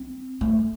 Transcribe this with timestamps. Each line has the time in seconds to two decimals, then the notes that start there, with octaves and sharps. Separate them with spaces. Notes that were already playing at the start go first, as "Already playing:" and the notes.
Already playing: C4
0.41 A3